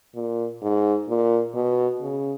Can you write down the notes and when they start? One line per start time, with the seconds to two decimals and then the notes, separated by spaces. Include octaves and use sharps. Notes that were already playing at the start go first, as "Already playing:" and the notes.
0.15 A#2
0.62 G#2
1.08 A#2
1.55 B2
2.01 C#3